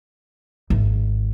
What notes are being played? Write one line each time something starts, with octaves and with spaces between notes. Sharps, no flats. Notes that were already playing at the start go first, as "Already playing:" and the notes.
G#1